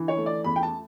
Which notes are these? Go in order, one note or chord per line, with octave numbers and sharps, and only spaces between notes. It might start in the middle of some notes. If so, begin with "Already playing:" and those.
Already playing: D3 E3
C#5
A3
D5
E2 B5
G5
A5